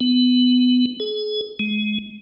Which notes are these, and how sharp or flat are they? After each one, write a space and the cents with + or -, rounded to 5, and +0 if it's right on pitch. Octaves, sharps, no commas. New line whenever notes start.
B3 +20
G#4 +35
G#3 +25